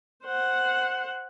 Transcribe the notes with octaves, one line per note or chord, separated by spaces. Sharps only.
C5 F#5